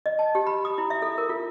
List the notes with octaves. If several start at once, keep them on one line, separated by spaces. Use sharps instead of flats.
D#5
A5
G4
B5
D#6
E4
E5
A4
A#4
F4